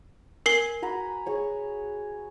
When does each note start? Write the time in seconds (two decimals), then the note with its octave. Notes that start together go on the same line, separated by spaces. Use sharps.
0.46 A#4 G#5 C7 G7
0.82 F#4 A#5 B5
1.26 G#4 C#5 C#6